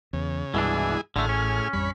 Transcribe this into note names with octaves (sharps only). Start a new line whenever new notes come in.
E2 C#3
C2 G2 B2 E3 G#3 D4 E4 G#4
A1 A2 D3 A3 G#4 F6
C#4
A1 F2 G3 C#5 B5